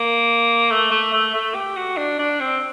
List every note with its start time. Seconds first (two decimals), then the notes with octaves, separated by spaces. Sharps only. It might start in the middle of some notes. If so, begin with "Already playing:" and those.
Already playing: A#3
0.71 A3
0.91 A3
1.13 A3
1.34 A3
1.55 G4
1.77 F#4
1.97 D4
2.19 D4
2.40 C4